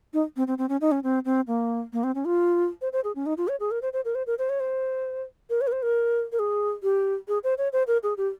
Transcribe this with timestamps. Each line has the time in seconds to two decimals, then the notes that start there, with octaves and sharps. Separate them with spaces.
0.13 D#4
0.36 C4
0.47 C4
0.58 C4
0.69 C#4
0.81 D#4
0.92 C#4
1.03 C4
1.25 C4
1.47 A#3
1.93 A#3
2.04 C4
2.15 C#4
2.25 F4
2.81 C5
2.93 C5
3.04 G#4
3.16 C#4
3.26 D#4
3.37 F4
3.48 C#5
3.60 G#4
3.71 A#4
3.82 C5
3.93 C5
4.05 A#4
4.15 C5
4.27 A#4
4.39 C5
4.49 C#5
4.60 C5
5.50 A#4
5.61 C#5
5.67 A#4
5.72 C5
5.83 A#4
6.32 A#4
6.39 G#4
6.83 G4
7.28 G#4
7.44 C5
7.58 C#5
7.73 C5
7.87 A#4
8.03 G#4
8.17 G4